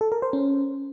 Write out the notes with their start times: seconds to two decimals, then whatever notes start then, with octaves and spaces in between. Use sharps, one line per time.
0.01 A4
0.12 A#4
0.22 C5
0.33 C#4